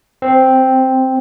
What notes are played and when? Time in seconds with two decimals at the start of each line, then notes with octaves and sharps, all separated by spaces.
0.22 C4